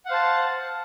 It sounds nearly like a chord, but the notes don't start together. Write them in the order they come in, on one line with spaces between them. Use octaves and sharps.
F#5 F5 C5 A5